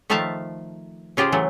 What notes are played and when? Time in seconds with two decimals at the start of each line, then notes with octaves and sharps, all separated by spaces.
0.10 D#3 F3 A3 E5 F5 A5
1.17 C#3 F4 G4 G#4 C5
1.32 E3 F#3 A3